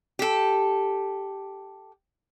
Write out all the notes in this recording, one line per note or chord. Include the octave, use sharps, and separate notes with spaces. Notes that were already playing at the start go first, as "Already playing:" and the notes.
G4 A4